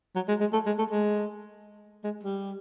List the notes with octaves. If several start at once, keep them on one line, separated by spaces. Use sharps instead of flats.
F#3
G#3
G#3
A3
G#3
A3
G#3
G#3
G3